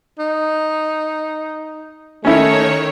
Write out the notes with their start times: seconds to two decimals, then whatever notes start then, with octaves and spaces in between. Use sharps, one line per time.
0.19 D#4
2.25 D#3 A3 C#4 E4 C#5